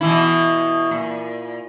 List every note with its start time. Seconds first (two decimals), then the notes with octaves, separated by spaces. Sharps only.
0.01 B2 E3 E4
0.91 A#2